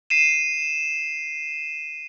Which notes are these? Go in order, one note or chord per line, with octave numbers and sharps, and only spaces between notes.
C7 D#7 E7